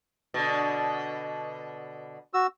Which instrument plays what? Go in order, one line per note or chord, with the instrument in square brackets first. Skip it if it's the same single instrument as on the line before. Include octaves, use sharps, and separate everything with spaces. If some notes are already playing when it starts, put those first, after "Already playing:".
[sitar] B2 D3
[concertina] F#4 E6